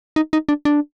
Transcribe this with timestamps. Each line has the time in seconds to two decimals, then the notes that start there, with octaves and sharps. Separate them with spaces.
0.16 D#4
0.33 D#4
0.49 D4
0.65 D4